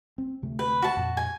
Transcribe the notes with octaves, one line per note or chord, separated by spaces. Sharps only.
C4
D2 C3 A3
B4
F#4 A5
F2 A#2
G#5